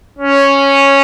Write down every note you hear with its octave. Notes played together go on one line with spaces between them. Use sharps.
C#4